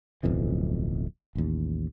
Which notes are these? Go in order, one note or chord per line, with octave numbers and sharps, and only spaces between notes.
D1 B1 F2 E3
A1 D#2